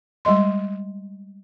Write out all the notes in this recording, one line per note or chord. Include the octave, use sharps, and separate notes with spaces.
G3 G#3 D#5 C6